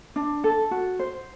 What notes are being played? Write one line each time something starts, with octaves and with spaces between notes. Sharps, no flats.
D4
A4
F#4
C5